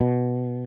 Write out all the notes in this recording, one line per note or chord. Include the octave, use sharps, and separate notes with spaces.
B2